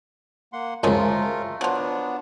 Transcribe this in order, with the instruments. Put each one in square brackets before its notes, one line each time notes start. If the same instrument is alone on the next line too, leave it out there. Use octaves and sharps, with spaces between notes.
[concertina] A#3 F#5 C6
[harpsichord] C#2 F#2 [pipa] F3 G#3 A3 [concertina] F4 A#4
[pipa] F3 F#3 [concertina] B3 D4